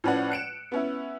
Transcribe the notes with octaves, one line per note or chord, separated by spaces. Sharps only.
A2 F3 C#4 B4 D5 F#5
F#6 C#7 D7 E7
B3 C#4 E4